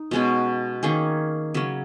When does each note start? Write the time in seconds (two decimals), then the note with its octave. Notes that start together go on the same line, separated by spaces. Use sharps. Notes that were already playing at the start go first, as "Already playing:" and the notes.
Already playing: D#4
0.11 B2 G#3 C#4 F#4
0.83 D#3 A#3 C#4 G#4
1.54 C#3 F#3 C#4